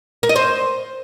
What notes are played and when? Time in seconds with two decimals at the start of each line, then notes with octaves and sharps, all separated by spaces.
0.23 A#4
0.29 D#5
0.36 C5